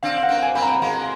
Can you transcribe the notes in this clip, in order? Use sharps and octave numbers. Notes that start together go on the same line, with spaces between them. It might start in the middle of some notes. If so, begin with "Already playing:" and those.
C4 D4 F5
F5
F#5
A#3 C4
G#5
A#3 C4 B5
A#5
G#3 A#3 A#5